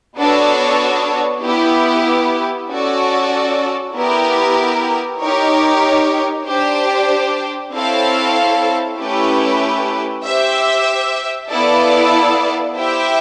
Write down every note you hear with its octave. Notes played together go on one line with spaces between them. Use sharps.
B3 D4 F#4 A4 C#5
B3 E4 G4
C#4 F#4 A4 D5
B3 E4 G4 A#4
D#4 G4 A#4 C#5
D4 G4 C5
C4 E4 A4 C#5 F5
A3 C#4 E4 G4 B4
G4 C5 E5
B3 E4 A4 D5 F5
E4 G4 C5 E5 G5